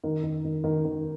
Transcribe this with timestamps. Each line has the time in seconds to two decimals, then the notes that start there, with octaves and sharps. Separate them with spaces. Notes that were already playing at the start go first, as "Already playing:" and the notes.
0.04 D#3
0.23 D#3
0.45 D#3
0.64 D#3
0.85 D#3